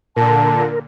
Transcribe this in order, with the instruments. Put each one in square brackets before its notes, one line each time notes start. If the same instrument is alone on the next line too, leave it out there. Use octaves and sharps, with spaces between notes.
[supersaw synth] A#2 D3 [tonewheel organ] A#4 [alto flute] A5